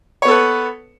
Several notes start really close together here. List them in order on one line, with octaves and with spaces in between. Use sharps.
C#5 B3 A4 B4